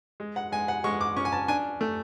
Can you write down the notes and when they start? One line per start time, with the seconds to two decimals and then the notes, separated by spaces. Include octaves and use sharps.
0.20 G#3
0.36 F#5
0.52 G#3 G#5
0.68 F#5
0.84 G#3 C#6
1.01 D6
1.16 C#4 C#6
1.25 G#5
1.32 A5
1.48 D4 G#5
1.81 A3